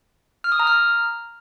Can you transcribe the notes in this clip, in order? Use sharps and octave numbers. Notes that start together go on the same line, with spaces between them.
F6
D#6
A#5
F6